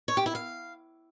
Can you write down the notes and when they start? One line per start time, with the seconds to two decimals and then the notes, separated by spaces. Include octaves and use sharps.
0.08 C#5
0.17 G4
0.26 E4
0.35 F5